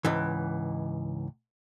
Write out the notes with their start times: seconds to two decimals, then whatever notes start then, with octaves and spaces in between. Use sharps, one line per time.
0.05 C#2 G#2 E3